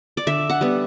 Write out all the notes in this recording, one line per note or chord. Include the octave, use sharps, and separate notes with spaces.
D5
D3 E5
F#5
G3 B3